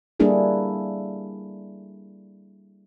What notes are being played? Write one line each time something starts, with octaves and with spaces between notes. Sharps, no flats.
G3 A#3 D4 E4 G#4 A4